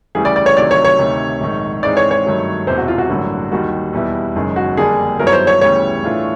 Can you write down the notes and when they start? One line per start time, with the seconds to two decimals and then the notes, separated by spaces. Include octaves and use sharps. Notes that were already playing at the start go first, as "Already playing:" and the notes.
0.15 D2 C#3 E3 G3 G#4
0.25 D5
0.36 D5
0.46 C#5
0.57 D2 C3 D#3 F#3 D5
0.71 C#5
0.84 C#5
0.99 D2 C3 D#3
1.40 A#1 G#2 D#3
1.83 G#2 E3 G#3 C4 D#4 D5
1.97 C#5
2.11 C#5
2.25 G2 D#3 F#3 A3
2.67 E1 E2 C3 C5
2.77 F#4
2.88 F4
2.98 F#4
3.09 A1 G2 D3 F#3 A#3
3.51 D#2 D#3 G3 A#3 F#4
3.93 E2 B2 G3 B3 E4
4.35 F#1 F#2 D#3 G#3
4.56 F#4
4.77 F2 D3 G3 A#3 D4 G#4
5.19 G2 D#3 F#3 B3 E4 A#4
5.27 C#5
5.33 C5
5.47 C#5
5.61 D2 C#3 E3 G3 B3 C#5
6.03 A2 E3 A3 D4 F4